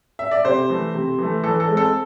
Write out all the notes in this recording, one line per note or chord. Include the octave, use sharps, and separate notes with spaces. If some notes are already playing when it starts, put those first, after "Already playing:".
E5
D5
C3 C5
E3 A3
C3
E3 A3
E3 A4
A4
G#3 C4
A4